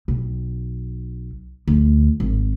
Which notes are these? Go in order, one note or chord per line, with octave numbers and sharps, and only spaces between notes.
B1
D2
G#1